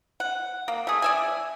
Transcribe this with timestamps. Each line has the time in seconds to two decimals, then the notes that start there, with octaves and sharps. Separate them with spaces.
0.20 F#5
0.68 A#3
0.87 A3 G#4
1.02 D5 E5 G#5